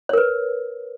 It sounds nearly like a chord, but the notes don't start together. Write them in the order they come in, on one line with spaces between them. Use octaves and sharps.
C#5 A#4 B4